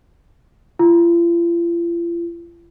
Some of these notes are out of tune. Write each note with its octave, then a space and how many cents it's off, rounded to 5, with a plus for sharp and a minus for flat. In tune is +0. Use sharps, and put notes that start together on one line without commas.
F4 -45